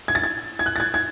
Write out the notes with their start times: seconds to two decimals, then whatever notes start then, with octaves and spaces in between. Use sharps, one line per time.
0.08 G#6
0.15 A6
0.24 G#6
0.59 G#6
0.66 F#6
0.76 A6
0.80 G#6
0.94 G#6